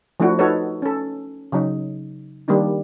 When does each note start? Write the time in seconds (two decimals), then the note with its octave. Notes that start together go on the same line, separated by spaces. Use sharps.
0.20 F3 A3 D4 E4 F#4
0.39 D#4 F#4 A4 B4 C#5
0.82 C#4 A4
1.52 C#3 F#3 D#4
2.48 D#3 G3 A#3 D4 D#4